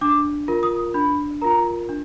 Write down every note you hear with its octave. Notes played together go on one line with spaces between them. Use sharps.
D4 D6
F4 A#4
D#6
D4 B5
F4 A#4 A#5
D4